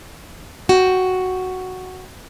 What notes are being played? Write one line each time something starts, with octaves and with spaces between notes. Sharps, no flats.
F#4 G5